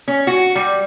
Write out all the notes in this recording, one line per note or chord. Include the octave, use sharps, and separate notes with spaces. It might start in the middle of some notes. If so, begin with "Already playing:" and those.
C#4
F#4
G3